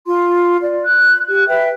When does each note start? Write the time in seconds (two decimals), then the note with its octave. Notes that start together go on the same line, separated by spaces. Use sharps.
0.08 F4 C6
0.63 D5
0.86 F#6
1.29 G4 F#6
1.48 B4 E5 G5